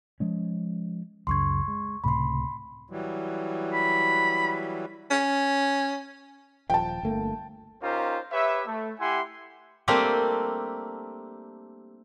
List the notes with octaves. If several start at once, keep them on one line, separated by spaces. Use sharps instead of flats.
F3 G#3 C#4
C#2 F#2 C#3 C6 C#6 G#6
G#3
C#2 A2 C3 B5 C6
E3 F#3 G3
B5
C#4
D#1 F3 G5 A5
G1 A3 A#3
C#4 D#4 F4 G4 A#4 C5
G4 B4 C#5 E5
A3
E4 G4 E5 F#5 G#5 C6
G3 A3 A#3 C4 D4 G4